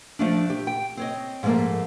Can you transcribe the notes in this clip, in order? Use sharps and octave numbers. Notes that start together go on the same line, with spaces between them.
F3 A3 D4
G4
G5
C4 C#5 D#5
G#2 F3 G3 A3 A#3